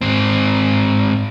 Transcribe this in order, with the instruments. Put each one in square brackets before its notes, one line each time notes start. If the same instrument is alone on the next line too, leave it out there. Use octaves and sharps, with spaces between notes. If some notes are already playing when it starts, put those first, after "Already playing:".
[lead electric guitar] G#2 C4